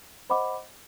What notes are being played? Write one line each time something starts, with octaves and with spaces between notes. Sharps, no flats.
C5 D#5 F#5 B5 D6